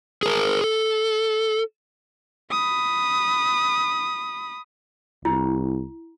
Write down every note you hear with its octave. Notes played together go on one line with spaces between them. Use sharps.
G#4 A#4
A4
B5 D#6
C2 E4